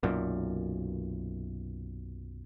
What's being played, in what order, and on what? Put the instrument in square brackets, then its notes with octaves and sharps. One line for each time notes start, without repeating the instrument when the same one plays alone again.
[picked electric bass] B1 F#2 A#2